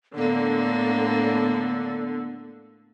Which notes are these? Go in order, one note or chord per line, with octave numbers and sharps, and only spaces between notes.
A2 D3 A#3 B3